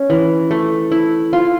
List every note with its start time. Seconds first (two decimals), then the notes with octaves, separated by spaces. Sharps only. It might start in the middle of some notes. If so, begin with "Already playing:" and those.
Already playing: C#4
0.10 E3
0.51 A3
0.92 E4
1.33 F4